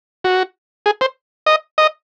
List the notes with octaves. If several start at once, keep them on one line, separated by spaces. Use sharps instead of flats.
F#4
G#4
C5
D#5
D#5